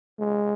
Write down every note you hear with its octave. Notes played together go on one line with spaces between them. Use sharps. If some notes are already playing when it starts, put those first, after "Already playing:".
G#3